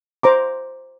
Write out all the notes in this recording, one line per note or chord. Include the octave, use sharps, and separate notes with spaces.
C5 A#5 D6